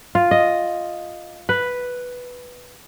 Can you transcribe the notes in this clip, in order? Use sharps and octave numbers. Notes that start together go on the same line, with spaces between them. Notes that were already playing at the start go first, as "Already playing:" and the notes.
F4
D#5
B4